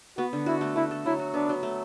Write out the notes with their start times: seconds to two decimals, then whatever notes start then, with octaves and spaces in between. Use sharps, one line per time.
0.17 B3 F#4
0.33 D3
0.46 E4 F#4
0.61 A3
0.75 A3 E4
0.91 A4
1.05 F#3 E4
1.19 F#4
1.34 B3 D4
1.49 F#3
1.63 A3